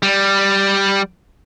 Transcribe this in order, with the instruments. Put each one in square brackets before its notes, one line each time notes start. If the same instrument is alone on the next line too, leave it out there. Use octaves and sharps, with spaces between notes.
[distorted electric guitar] G3